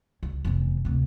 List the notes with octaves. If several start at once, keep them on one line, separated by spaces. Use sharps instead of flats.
C#2
F1 E2
D2 C3